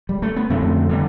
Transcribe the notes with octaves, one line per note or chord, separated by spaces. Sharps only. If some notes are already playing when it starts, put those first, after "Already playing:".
G3
A3
B3
F2 D3 A3 C4
D3 G3 B3